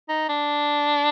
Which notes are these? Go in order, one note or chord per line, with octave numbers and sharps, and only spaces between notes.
D#4
D4